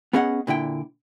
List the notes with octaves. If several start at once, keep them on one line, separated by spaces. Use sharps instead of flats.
B3 C#4 G#4 D#5 E5 F#5
A#2 D3 E4 G5